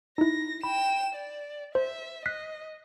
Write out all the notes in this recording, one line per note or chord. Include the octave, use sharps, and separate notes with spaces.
D#4 E4 A#6
G5 B5 E7
D5
C5 E5
D#5 F#6 B6 C7